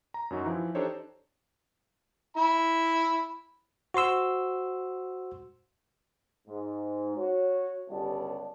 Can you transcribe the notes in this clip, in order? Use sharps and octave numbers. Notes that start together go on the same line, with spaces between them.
A#5
F#2 F#3 D#4 F#4
E3 F3 E4
D4 D#4 G4 A4 C5 C#5
E4 B5
F#4 C5 C6 E6
G#2
F#4 C#5
G1 C#2 G3 D5 A5